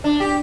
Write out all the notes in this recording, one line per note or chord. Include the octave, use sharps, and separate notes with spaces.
D4
G4